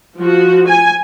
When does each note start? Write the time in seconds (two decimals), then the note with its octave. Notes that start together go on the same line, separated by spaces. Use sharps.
0.18 F3 F#4
0.68 G#5